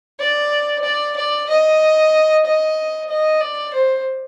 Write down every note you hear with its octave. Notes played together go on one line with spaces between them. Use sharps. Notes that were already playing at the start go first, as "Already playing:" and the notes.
D5
D5
D5
D#5
D#5
D#5
D5
C5